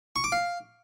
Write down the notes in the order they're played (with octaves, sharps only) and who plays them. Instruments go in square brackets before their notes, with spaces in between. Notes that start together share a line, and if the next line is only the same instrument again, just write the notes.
[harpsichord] C#6
D6
F5